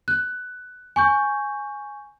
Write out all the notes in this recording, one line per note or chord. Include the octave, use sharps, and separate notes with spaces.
F#6
G#5 C#6 G6